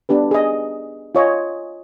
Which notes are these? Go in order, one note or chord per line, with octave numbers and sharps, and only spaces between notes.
B3 D4 G4 B4
G#4 D#5
F4 C#5 D#5 G#5